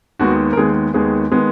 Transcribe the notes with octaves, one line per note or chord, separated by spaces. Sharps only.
D#2 D#3 G#3 B3 F#4
A#4
D#2 D#3 G#3 B3 G#4
D#2 D#3 G#3 B3 G#4
D#3 G#3 B3